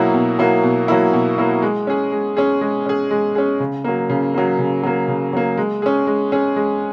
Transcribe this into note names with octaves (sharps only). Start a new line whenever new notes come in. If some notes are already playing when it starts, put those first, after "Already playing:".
Already playing: B2 F#3 A#3 E4
B2
F#3 A#3 E4
B2
F#3 A#3 E4
B2
F#3 A#3 E4
G#3
C#4 G#4
G#3
C#4 G#4
G#3
C#4 G#4
G#3
C#4 G#4
C#3
F#3 A#3
C#3
F#3 A#3
C#3
F#3 A#3
C#3
F#3 A#3
G#3
C#4 G#4
G#3
C#4 G#4
G#3